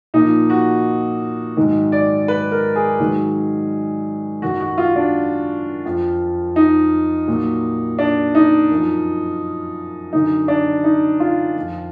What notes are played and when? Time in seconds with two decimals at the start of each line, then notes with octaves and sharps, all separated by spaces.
0.14 A#2 F3 D#4
0.50 F#4
1.57 G#2 D#3 F#3
1.92 D5
2.28 B4
2.52 A#4
2.76 G#4
3.00 G#2 D#3 F#3
4.42 F#2 D#3 F#3 F#4
4.60 F#4
4.78 F4
4.96 D4
5.85 F2 F3
6.56 D#4
7.28 A#2 F#3
7.99 D4
8.35 D#4
8.71 F#2 F3
10.13 F#2 D3 F#3 D#4
10.48 D4
10.84 D#4
11.20 F4
11.56 F2 F3